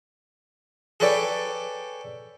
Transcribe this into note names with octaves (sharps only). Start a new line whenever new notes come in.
G#4 A4 B4 C#5 D5 G5